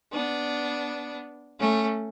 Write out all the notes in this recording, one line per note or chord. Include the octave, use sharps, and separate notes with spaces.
B3 D4
A3 C#4